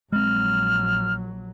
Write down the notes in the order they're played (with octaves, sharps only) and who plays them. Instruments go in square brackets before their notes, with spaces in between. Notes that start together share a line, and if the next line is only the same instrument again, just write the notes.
[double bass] A#1 F#3 [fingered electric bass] G#3 C4 [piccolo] F6